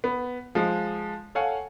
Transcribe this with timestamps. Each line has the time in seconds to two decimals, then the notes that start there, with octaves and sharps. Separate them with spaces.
0.04 B3
0.55 F3 G#3
1.35 A4 C#5 F5 F#5 G#5